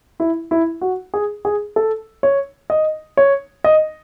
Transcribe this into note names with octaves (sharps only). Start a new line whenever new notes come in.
E4
E4
F#4
G#4
G#4
A4
C#5
D#5
C#5
D#5